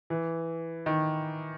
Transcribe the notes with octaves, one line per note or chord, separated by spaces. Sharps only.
E3
D#3